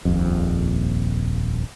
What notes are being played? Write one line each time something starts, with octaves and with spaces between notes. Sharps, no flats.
D#1 A#1 F2